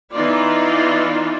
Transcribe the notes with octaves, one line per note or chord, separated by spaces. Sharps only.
E3 B3 D#4 F4 D5